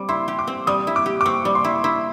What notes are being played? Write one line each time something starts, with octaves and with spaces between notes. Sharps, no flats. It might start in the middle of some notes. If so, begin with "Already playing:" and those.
Already playing: G3 C4 D6
E4 C6
G4
D6
C4
G3 D#6
E4
D6
G4
D6
C4 C#6
G3
C6
E4
E4